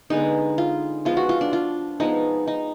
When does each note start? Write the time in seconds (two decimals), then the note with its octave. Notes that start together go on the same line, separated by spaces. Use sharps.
0.10 D3 G#3 B3 D#4
0.58 F4
1.05 F3 G#3 B3 F4
1.17 F#4
1.29 F4
1.41 D4
1.53 F4
2.00 F3 G#3 B3 D#4
2.48 D#4